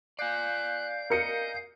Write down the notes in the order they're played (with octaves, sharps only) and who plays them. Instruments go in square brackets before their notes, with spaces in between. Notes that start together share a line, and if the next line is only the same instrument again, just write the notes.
[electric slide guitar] D5 G#5 [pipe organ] F5 G6 [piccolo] F#6
[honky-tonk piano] A#4 C#7 [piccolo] D#5